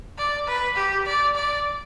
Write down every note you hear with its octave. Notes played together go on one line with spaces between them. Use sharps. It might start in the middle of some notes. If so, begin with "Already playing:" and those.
D5
B4
G4
D5
D5